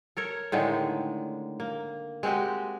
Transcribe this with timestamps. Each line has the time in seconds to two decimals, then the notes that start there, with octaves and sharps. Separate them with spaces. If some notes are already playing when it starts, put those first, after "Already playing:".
0.17 A4 A#4 C#5
0.52 A2 D3 D#3 G#3
1.60 A#3
2.23 G#3 C4 F#4 G4